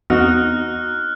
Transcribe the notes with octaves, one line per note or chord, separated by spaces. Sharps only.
E2 B3 C4 D#4 F#4 F6 F#6